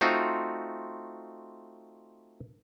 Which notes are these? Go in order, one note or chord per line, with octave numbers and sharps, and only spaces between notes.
A3 C4 D#4 F4 F#4